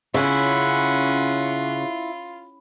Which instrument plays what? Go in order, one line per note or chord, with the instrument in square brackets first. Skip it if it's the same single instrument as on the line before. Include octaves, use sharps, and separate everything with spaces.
[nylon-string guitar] C#3 [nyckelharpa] C#4 F#5 [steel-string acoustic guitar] E4 [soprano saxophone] F4